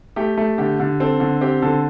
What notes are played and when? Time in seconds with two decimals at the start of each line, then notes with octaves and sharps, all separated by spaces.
0.16 A3 G4
0.37 A3
0.58 D3 G4
0.80 D3
1.00 C4 A4
1.20 D3
1.41 C4 G4
1.62 D3 A4